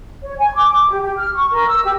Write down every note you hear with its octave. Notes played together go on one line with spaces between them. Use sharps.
C#5
G#5
D6
D6
G4
G4
F6
C#6
A#4
E6
G4